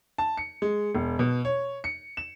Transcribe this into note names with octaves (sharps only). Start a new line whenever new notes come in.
A5
C#7
G#3
E1
B2
C#5
C#7
E7